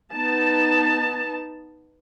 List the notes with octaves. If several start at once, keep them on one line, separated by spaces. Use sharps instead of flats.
B3 D#4 A5